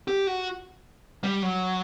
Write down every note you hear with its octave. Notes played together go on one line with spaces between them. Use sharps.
G4
F#4
G3
F#3